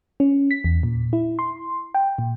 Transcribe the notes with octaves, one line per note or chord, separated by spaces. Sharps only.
C#4
B6
E2
A#2
E4
C6
G5
A#2